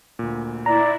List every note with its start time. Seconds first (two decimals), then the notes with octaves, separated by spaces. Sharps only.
0.19 D2 A#2
0.66 E4 D5 A#5